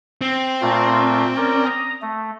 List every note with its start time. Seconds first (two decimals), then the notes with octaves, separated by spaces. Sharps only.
0.21 C4
0.62 A#2 A3 F4
1.36 C#4 A#4 D5
1.66 A#5 D#6
2.02 A3